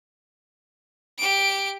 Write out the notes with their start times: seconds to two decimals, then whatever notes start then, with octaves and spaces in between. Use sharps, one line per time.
1.18 G4 D7